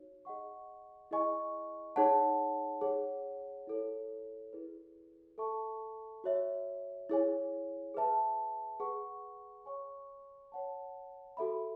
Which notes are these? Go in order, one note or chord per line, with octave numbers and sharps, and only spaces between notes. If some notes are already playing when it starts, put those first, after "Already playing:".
Already playing: D#4 F#4 C#5
G#4 D#5 F#5 C#6
E4 G#4 D#5 G#5 C#6
D#4 G#4 C#5 F#5 A5
G#4 C#5 F#5
E4 A4 C#5
E4 G#4 B4
A4 E5 A5 C#6
F#4 C#5 E5
E4 G#4 C#5 G#5
G#4 B4 E5 A5
G#4 B4 F#5 C#6
C#5 G#5 C#6
C#5 F#5 A5
F#4 A4 E5 B5